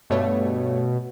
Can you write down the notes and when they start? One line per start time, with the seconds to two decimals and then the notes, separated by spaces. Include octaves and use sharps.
0.10 G2 B2 A3 C#5